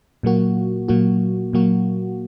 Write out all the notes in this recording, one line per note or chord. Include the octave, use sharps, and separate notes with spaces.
A#2 F#3 A#3 F#4
A#2 F#3 A#3 F#4
A#2 F#3 A#3 F#4